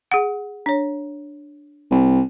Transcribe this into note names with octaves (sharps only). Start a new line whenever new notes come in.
G#4 F#5
D4 C#5
C2